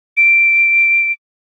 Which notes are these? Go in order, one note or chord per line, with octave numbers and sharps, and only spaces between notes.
D7